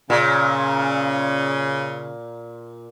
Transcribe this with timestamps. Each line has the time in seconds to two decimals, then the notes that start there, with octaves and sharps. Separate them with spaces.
0.10 A#2 C#3